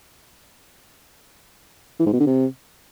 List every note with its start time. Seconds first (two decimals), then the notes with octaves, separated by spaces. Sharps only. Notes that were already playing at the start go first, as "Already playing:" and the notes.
2.00 E3
2.06 G#2
2.13 B2
2.20 D3
2.27 C3